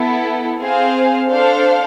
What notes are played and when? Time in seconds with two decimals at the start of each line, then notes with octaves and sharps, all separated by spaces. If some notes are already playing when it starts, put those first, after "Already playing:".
Already playing: B3 E4 A4
0.59 C4 G#4 C5 F5
1.29 D4 A4 C5 F5